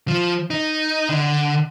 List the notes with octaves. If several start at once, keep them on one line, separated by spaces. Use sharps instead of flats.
F3
D#4
D3